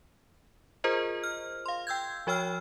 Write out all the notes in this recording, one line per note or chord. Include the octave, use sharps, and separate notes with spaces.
F4 G#4 A#4 C5 D#5
F6
F5 C6
G5 E6 G6 G#6
F3 F#4 C#5 G5 E6 F6